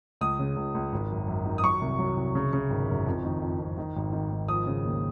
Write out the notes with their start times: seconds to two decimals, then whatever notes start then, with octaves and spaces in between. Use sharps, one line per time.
0.21 C#2 D#6
0.39 C#3
0.56 C#2
0.75 C#2
0.93 G#1
1.11 F#2
1.28 F#2
1.46 D#3
1.58 D#6
1.64 F#3 C#6
1.81 C2
1.99 F#3
2.17 C2
2.35 C#3
2.53 C#3
2.70 G#1
2.88 F#2
3.06 F2
3.25 D#3
3.42 F2
3.59 F2
3.78 D#3
3.96 G#1
4.13 D#3
4.31 G#1
4.48 F3 D#6
4.67 C#3
4.85 D#2